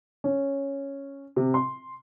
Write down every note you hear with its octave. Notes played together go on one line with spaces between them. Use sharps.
C#4
C3
C6